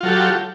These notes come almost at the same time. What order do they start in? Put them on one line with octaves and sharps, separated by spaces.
F4 F#3 A4 G4